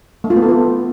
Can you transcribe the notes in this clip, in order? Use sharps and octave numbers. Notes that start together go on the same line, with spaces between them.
A3
F4
B3
A4
B3